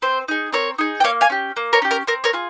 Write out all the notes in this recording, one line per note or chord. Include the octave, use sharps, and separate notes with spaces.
C4 C5
D#4 G#4
C4 A#4 C#5
D#4 G#4
G5
A#3 C#5 F5
F5 G#5
C#4 G4
A#3
A#4 C#5
C#4 G4
A#4
C4 A#4
A#4 C#5
F4 G#4